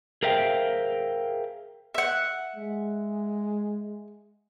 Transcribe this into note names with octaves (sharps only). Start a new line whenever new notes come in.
G#4 A#4 C5 E5 F5 G5
E5 F#5
G#3